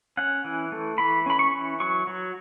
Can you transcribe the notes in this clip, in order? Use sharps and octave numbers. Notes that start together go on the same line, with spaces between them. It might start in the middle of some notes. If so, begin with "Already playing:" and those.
C#4 F#5
E3
A3
E3 B5
C#4 B5
C#6
E3
F#3 C#6
F#3